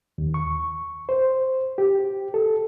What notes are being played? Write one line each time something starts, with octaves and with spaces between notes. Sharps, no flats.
D#2
C#6
C5
G4
A4